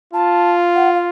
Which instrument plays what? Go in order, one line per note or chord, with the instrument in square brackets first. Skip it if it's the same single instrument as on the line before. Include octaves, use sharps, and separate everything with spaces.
[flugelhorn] F4 [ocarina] A5
[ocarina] F#5
F5